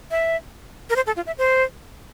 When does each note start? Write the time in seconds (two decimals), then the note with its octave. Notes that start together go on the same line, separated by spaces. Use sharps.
0.11 E5
0.90 A#4
0.96 C5
1.07 A4
1.16 F4
1.27 E5
1.38 C5